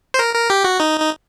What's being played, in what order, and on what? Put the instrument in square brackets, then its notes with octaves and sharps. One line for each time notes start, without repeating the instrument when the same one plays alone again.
[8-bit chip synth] C5
A#4
A#4
G4
F#4
D#4
D#4